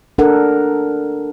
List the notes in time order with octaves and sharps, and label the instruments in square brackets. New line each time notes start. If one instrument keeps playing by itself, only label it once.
[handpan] D4 A4 A#4 F#5